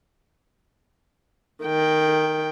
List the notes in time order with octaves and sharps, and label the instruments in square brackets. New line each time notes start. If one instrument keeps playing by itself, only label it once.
[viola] D#3 G5